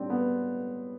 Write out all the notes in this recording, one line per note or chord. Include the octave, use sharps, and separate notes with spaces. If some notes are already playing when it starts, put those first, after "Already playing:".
Already playing: A2 G3 C4 D4
B3